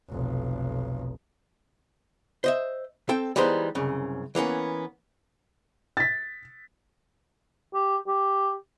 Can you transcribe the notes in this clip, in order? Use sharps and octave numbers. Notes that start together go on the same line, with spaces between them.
F1 B1
C5 D#5 E5
C4 A4 G5
E3 G3 G#3 B3 D#4 C5
C2 F#2 C#3
E3 A#3 B3 C#4
A6 B6
G4
G4